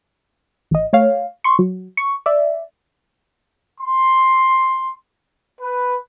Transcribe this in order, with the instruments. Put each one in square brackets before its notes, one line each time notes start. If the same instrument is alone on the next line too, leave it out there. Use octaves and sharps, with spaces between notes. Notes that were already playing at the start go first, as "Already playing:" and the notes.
[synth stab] A1 D#5
A3 C#5 F5
C6 C#6
F#3
C#6
D5 E5
[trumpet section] C6
B4